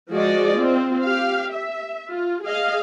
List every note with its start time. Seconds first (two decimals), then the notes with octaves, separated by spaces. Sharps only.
0.10 F3 G#3 F#4 G#4 D5 D#5
0.57 C4 F4
1.04 G4 F5
1.52 E5
2.10 F4
2.44 G#4 D#5 F5